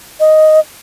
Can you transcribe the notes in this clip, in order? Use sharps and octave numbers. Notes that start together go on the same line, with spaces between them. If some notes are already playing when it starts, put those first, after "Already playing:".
D#5